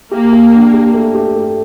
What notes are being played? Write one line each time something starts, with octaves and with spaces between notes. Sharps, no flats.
A#3 G4
G4
D4
G4
A3
G4
A3